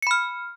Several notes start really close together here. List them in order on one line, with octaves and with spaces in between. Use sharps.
C#7 B5 F6